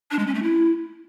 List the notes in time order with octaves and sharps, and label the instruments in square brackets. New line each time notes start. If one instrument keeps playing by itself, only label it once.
[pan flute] D4
G#3
C#4
A3
E4